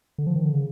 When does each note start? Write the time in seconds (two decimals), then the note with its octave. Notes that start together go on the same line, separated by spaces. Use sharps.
0.18 D3
0.27 F3
0.36 D#3
0.45 D3
0.54 C#3